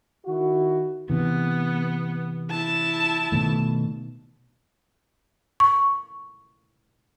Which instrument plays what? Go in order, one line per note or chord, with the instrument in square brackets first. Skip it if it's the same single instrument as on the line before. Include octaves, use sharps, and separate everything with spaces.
[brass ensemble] D#3 E4 F#4
[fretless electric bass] C3 E3 [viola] B3
[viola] E4 A5
[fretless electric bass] B2 D#3 A3
[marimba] C#6